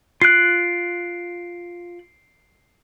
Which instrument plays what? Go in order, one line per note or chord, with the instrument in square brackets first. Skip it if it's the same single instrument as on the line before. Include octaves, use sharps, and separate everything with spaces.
[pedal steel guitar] F4 F#6 [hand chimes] C7 D7